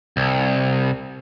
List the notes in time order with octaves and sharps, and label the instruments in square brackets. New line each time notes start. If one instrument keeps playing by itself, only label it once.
[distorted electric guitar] C2